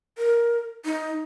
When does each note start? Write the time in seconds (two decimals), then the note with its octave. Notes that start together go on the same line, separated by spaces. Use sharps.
0.18 A#4
0.85 D#4